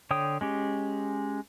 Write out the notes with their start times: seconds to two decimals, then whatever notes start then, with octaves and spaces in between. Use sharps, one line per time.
0.11 D3 C#5 G5 D#6
0.41 G#3 C#4 G4